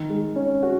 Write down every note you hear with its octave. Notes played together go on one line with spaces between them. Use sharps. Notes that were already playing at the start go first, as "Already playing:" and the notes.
Already playing: D#3
G#3
C#4
F#4